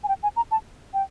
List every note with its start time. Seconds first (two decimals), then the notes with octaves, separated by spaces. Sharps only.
0.04 G#5
0.08 G5
0.23 G#5
0.36 A#5
0.51 A5
0.94 G5